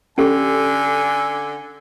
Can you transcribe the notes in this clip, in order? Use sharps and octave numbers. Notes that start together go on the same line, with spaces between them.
D3 C#4 G4 A4 G#5